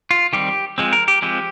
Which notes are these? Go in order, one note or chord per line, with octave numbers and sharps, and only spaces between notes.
F4
D#3 G3 C4 G4
F3 G#3 C4
A#4
G4
F3 G#3 C4 G4